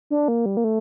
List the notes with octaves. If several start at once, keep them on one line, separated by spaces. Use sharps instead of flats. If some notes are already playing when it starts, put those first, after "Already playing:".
D4
A#3
G3
A#3
A3